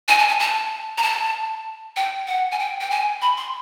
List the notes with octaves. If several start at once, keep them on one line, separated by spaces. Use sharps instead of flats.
G#5
A5
G#5
A5
A#5
A5
G5
F#5
G#5
G5
G5
G#5
B5
C6